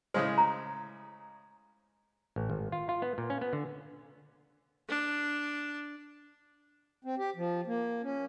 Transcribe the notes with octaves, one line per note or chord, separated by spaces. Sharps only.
A2 C#3 G#3 C5
A#5
A1
G#1
F4
F4
B3
A#2
C#4
B3
D3
D4
C4
G4
F3
A#3
C#4